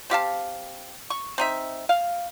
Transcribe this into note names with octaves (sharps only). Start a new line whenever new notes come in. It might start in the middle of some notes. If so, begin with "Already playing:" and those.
C4 G4 F5 A5
C#6
C4 D#4 E5
F5